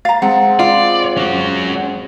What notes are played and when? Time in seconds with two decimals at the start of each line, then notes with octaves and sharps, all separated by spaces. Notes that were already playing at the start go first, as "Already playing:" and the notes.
0.05 F5 A#5 A6
0.22 G#3 C4 F#5
0.59 F4 D5
1.17 C#4 F#4